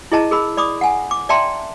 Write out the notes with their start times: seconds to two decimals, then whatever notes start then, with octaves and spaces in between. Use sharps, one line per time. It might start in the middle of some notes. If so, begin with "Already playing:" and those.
0.12 E4 G#4 D#5 A5 A#5
0.31 G#4 A#4 B5
0.57 D5 B5 D6 D#6
0.81 F#5 G#5
1.11 D6
1.29 D5 E5 G5 A5 A#5 C6